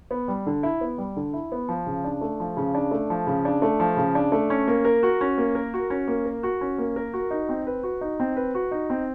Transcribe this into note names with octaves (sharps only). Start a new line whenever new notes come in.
B3
G3
D3
E4
B3
G3
D3
E4
B3
F3
C#3
D4
A3
F3
C#3
D4
A3
F3
C#3
D4
A3
F3
C#3
D4
A3
C#4
A#3
A#4
F#4
C#4
A#3
A#4
F#4
C#4
A#3
A#4
F#4
C#4
A#3
A#4
F#4
D#4
C4
B4
F#4
D#4
C4
B4
F#4
D#4
C4